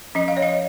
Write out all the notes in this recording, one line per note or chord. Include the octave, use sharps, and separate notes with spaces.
F3 C#4 D#5
F5
C#5
D#5